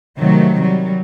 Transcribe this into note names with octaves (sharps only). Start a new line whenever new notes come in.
C3 D#3 F#3 A3
F#3 G3